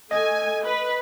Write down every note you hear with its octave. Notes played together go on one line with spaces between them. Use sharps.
A3 D#5 G#5
B4